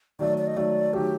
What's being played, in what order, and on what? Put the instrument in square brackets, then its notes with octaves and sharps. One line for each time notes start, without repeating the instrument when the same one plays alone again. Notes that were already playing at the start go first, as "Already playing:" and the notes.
[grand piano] D#3 F#3 A3 [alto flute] D5
[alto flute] D5
D#5
[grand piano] D#3 F#3 A3 [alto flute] D5
[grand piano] D#3 F#3 A3 [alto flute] G4